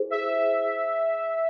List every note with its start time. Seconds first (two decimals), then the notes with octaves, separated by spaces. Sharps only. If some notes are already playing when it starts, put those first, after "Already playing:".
Already playing: E4 G#4 C5
0.10 E5